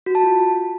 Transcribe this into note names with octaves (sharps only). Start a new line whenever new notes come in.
F#4
A5
F4